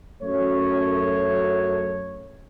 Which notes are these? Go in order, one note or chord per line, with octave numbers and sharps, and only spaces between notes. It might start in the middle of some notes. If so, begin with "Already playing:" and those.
F#2 A3 C#5